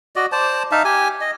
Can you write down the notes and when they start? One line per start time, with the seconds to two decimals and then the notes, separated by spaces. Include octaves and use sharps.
0.16 F#4 D5 D#5
0.32 C5 D5 A5
0.72 D#4 E5 F5 A5
0.85 G4 G#5
1.21 D#5